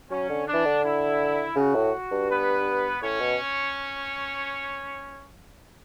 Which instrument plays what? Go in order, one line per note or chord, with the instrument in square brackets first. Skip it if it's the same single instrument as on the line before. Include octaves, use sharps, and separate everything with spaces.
[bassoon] F#3 [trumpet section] C#4
[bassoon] D3
[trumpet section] D4
[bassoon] E3
D3
[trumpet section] E4
[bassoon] C#3 [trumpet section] F#4
[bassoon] A2
G2
[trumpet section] B3 B4
[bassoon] A2 [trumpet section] C#4 C#5
[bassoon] B2